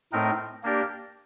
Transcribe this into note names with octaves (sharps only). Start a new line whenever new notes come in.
A2 A3 C4 D#4 A#4
A#3 D4 G4 A#4 D5